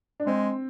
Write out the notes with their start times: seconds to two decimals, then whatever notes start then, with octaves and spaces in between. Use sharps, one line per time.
0.20 D4
0.27 G#3 C4